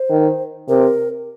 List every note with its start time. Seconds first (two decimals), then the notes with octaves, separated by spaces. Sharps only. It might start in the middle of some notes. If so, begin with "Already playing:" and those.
Already playing: C5
0.10 D#3
0.68 C3 A#4